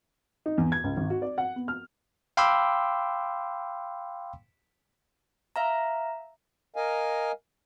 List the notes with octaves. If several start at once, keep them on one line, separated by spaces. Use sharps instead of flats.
D#4
E2
G#6
C#2
G#1
F#4
D5
F#5
B3
F6
F5 G5 B5 C6 D6 E6
E5 F5 A#5
A#4 D#5 F5 G#5